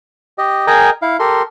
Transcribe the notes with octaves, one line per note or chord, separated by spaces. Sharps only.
G4 D#5
G#4 A#4 D#5 G5 G#5 A#5
E4 F5
G4 A4 A#4 C6